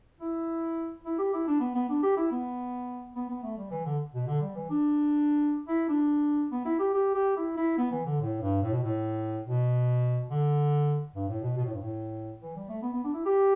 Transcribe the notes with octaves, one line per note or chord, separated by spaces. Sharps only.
E4
E4
G4
E4
D4
B3
B3
D4
G4
E4
B3
B3
B3
A3
G3
E3
D3
B2
D3
G3
E3
D4
E4
D4
B3
E4
G4
G4
G4
E4
E4
B3
E3
D3
A2
G2
A2
B2
A2
B2
D3
G2
A2
B2
B2
A2
G2
A2
E3
G3
A3
B3
B3
D4
E4
G4